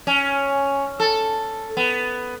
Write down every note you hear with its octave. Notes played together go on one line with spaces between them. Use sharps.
C#4
A4
B3